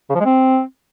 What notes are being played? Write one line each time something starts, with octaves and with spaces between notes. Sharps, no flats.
C#3
F3
G#3
C4